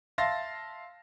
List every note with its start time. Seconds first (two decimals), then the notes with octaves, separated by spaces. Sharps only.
0.18 E5 F5 A5 C6 A6 A#6